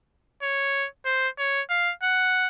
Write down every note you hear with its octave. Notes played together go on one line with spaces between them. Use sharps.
C#5
C5
C#5
F5
F#5